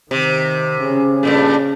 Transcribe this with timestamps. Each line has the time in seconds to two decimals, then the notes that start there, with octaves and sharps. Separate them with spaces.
0.11 C3 D#3
0.81 C#3 C#4
1.23 G2 A#2 A3